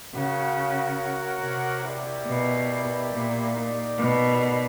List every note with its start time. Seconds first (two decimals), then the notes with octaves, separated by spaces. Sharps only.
0.14 C#3 F#4 A#4 C#5 F#5
1.42 C3
1.84 E4 G4 A#4 D5
2.26 B2
3.12 A#2
3.55 D#4 G4 A#4 D5
3.98 B2